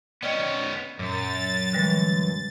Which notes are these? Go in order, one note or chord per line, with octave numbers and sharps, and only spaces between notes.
B3 C#4 D5 D#5 G5
F#2 A#2 A6
D3 E3 G3 G#3